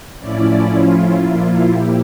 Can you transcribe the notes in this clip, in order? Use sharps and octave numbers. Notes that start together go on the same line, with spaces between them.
A2 F3 C#4 E4 D5
F4
A#2 F3 A#3 E4
G4